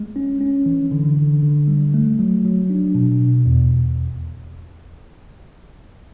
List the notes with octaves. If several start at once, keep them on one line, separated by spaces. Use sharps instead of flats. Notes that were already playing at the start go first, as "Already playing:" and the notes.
Already playing: G#3
C#4
C#4
E3
D3
D3
D3
G3
A3
F#3
F#3
D4
B2
B2
E2